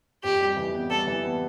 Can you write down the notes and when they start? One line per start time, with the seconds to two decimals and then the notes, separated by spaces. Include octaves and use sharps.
0.24 F2 G4
0.40 G3
0.56 E3
0.74 B3
0.90 G3 A4
1.07 E3
1.24 B3